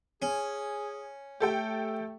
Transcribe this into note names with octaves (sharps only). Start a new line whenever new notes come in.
C#4 G#4
A3 G4 A4 G5